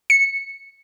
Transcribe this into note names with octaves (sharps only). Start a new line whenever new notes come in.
C#7